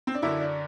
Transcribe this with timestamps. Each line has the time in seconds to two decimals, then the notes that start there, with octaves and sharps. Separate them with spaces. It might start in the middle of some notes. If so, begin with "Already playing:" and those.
0.07 C4
0.14 D4
0.22 F#2 D3 E4
0.40 D4